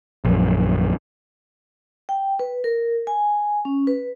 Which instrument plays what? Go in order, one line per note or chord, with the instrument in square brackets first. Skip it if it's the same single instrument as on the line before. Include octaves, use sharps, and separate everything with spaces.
[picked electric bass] A#1 F#2
[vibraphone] G5
B4
A#4
G#5
C#4
B4